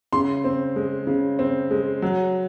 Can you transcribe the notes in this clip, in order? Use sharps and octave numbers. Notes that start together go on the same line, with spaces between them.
C#3 C6
C4
G#3
C#3
C4
G#3
F#3